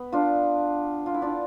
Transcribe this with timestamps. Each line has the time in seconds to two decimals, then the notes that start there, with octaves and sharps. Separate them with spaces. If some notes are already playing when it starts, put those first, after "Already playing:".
Already playing: B3
0.12 D4 F4
1.06 F4
1.14 E4
1.22 D4 F4